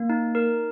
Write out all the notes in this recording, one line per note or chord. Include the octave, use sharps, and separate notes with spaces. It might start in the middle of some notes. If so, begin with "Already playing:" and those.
Already playing: A#3
D#4
A#4